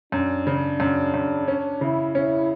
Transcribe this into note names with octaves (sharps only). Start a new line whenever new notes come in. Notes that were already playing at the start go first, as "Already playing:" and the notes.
F#2 D4
C#3
F#2
F#2
C#4 D4
C#3 E4
C#4 E4